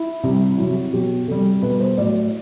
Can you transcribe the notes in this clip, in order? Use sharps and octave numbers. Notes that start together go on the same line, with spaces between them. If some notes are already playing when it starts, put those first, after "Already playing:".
Already playing: E4
C3 G3
C3 F#3 E4
F#4
B2 F#3 G4
C3 G3 A4
B2 G3 B4
C5
A2 F#3 D5